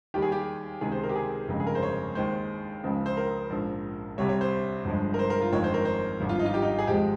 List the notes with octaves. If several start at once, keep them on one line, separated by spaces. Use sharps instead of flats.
D#2 D#3 G3 G4
G#4
G4
C#2 C3 D#3 G#3 G#4
C5
A#4
G4
G#4
G1 F2 C#3 G#3
G#4
A#4
C5
C#5
D#2 D#3 G#3 C5
C#2 C#3 F3 G#3
C5
A#4
A#1 G#2 F3
C2 C3 G3 C#5
C#5
C5
G1 G2 F3 G#3
A#4
C5
A#4
F4
G1 F2 D#3 G#3 C#5
C5
A#4
C5
G#1 G2 F3
F4
D#4
F4
G4
D#4
G#4
G#1 G#2 F3 G#3 G4